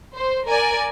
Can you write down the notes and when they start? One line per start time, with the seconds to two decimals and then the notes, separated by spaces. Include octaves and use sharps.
0.15 C5
0.48 A#4 D5 G#5